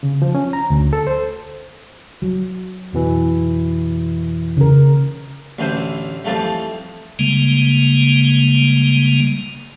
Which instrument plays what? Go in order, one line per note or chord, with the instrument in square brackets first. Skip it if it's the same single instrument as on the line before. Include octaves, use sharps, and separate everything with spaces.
[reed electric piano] C#3
F3
C#4
A#5
D2
A4
C5
[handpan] F#3
[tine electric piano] F2 B2 E3
[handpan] C#3 A#4
[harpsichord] A1 D2 E3 C5
F2 E3 F3 G3 A3
[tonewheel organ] C#3 G3 G#3 A#3